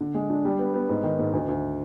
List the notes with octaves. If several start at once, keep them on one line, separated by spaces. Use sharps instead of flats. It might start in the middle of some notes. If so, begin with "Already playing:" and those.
D3
G#3
D4
G3
B3
B3
G#2
D#3
G#2
D2
D2